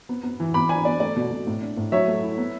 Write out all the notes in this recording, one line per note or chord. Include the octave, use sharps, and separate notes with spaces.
B3
B3
E3
B3 B5 D6
D4 G#5 B5
B3 D5
A3 D5
B2
B2
A2
D4
A2
F#3 C#5 E5
A3
E4
B3